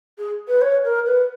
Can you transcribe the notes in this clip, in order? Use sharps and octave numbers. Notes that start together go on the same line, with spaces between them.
G#4
B4
C#5
A#4
B4